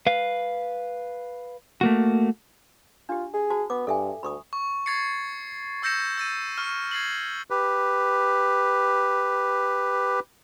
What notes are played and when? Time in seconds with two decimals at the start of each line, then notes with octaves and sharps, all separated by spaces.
0.07 B4 F5
1.81 A3 A#3 F#4
3.09 D4 F4 G4
3.33 G#4
3.50 F#4 C5 A5
3.70 B3 D6
3.87 G2 A4 E5 G#5
4.23 D2 B5 C#6 D#6
4.53 C#6
4.86 C#6 G#6 A6 C7 C#7
5.83 C#6 E6 G6 A#6 C#7 E7
6.18 E6 A6 D#7
6.57 C#6 F6 E7
6.91 G#6 A6 C7 F#7
7.50 G4 B4